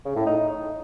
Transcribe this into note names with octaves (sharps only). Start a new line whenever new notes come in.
C#3
A2
D#4